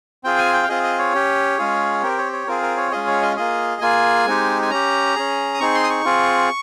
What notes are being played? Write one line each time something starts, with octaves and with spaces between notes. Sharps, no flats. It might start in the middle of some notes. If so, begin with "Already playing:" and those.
C4 F4 G#4 G5
G#5
G5
F5
C4 F4 G#4 D#5
D#5
C#5
C#4 G4
G#3 C#4 F4 G#4
C4 G4 A#4
C#5
C#5
C4 F4 G#4 A#4
A#4
C#5
G#3 C#4 F4 G#4 D#5
C#5
D#5
A#3 F4 G#4 D#5
A#3 F4 G#4 G#5
G#3 C4 D#4 G4
G#5
C#4 G4 A#5
C#4 G#4
D#6
C4 D#4 G#4 C#6
C6
D#6
C#6
C4 F4 G#4